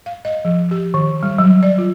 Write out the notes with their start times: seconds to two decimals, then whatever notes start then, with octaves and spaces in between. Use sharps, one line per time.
0.06 F5
0.25 D#5
0.45 F3
0.71 G4
0.94 D#3
1.23 G3
1.38 F#3
1.63 D5
1.78 F4